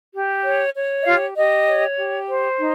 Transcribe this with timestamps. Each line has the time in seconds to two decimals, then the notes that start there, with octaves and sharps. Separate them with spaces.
0.14 G4
0.44 C#5
0.75 C#5
1.02 D#5
1.06 F4 G4 F5
1.37 G4 D#5
1.67 C#5
1.98 G4
2.29 C5
2.60 D#4